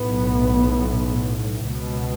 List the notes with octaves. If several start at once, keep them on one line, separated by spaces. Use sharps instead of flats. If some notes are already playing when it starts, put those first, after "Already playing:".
Already playing: B1 A2 B3
C#2 B2